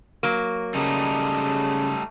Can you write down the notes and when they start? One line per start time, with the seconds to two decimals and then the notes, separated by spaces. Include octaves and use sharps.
0.23 F#3 A#3
0.75 C#3 G3 A3 D#4